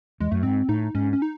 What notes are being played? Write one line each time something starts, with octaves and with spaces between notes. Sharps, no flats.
E2 G#3
F#2 A3
G#2 C4
A2 D#4
G#2 C#4
C#4
D#4